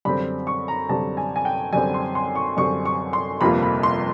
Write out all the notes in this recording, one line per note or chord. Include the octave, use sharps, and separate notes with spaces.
F#2 D3 G3 C4 B5
C#6
A#5
F#2 D3 G3 C4 A5
G#5
G#5
G5
F#2 D3 G3 C4 G#5
C6
C6
C#6
F#2 D3 G3 C4 C#6
C#6
C6
G1 F2 C3 F3 A#3 B5
B5
C6